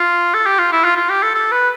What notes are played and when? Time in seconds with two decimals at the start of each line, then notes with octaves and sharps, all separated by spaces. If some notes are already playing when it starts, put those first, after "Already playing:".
Already playing: F4
0.34 A4
0.46 G4
0.59 F4
0.72 E4
0.84 F4
0.97 F4
1.09 G4
1.23 A4
1.35 A4
1.52 B4